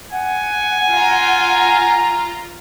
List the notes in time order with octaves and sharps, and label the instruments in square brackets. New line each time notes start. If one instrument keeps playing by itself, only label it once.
[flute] F#5 [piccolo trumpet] G#5
[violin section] F4 A#5